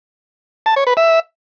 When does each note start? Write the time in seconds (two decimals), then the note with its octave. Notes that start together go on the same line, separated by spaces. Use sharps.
0.66 A5
0.76 C#5
0.87 B4
0.97 E5